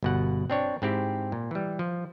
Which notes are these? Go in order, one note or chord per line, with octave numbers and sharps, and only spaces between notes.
G1 B2 F#5
C4 D4 C#5
G#2 C4 E4 G4
A#2
E3 G3
F3